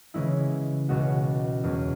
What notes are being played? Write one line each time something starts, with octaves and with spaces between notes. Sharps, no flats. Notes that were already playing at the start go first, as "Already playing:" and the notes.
C#3 E3 G#3 C#4 E4
C#2 B2 G#3 C#4 F#4
E2 B2 G#3 C#4